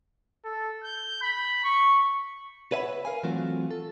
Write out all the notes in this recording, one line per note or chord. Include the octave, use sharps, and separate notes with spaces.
A4
G6
B5
C#6
B4 C#5 E5 F#5 A5 B5
A#4 F5 G#5
E3 F#3 A3 C4 F4 F#4
A4